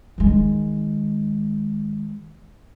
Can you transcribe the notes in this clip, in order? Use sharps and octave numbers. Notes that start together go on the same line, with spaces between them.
D#3 G#3